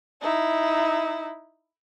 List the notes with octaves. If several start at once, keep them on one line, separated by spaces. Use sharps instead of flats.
D#4 E4